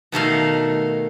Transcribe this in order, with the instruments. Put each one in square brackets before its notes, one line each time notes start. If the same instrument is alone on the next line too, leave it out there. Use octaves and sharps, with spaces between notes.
[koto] B2 D#3 A3 F5